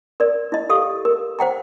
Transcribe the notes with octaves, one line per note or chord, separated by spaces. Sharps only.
A#4 D5
E4 D#5
G4 A4 F5 D#6
A#4
C5 F#5 G5 A#5